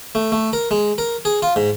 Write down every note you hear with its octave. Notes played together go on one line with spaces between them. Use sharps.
A3
A3
A#4
G#3
A#4
G#4
F4
G#2